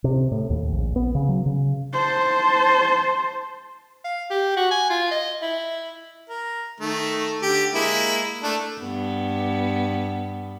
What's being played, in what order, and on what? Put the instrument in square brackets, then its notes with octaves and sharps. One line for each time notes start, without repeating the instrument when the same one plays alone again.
[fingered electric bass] C3
A2
D#2
A#1
B3
C#3
F#3
C#3
[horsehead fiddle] C5 A5
[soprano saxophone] F5
G4
F#4
G#5
F4
D#5
E4
[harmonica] A#4
D#3 A3
D3 G4
G#3 A#3 E4
A3 D4
[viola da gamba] G2 B3